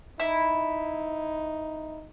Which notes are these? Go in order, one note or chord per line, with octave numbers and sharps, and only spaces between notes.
D#4 E4